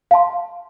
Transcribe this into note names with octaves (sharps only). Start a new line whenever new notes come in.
F5 A5 C6